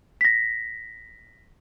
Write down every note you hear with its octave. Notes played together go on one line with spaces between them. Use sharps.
A#6 B6